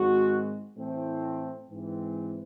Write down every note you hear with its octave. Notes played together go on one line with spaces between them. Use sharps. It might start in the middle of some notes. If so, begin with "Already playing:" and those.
Already playing: G#2 D#3 G#3 C4 F#4
A2 E3 A3 C4
G#2 E3 C4